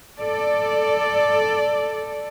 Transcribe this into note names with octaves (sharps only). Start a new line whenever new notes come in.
A4 D5